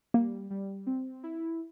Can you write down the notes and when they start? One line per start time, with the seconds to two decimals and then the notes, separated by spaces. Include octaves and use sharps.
0.14 G3 A#3
0.51 G3
0.86 C4
1.23 E4